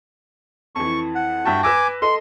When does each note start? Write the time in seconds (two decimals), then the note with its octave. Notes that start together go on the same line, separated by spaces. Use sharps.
0.75 F2 E3 C#6
1.15 F#5
1.45 G2 F#4 E5 G5 A5
1.63 B4 G#5 D6 E6 A#6
2.02 A4 D#5 C6